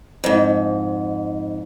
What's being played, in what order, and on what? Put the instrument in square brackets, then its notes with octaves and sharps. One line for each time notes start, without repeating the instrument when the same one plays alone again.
[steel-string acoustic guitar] F2 G#2